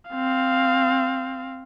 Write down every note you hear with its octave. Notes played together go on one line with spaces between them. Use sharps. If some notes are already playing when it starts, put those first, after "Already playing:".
C4 F5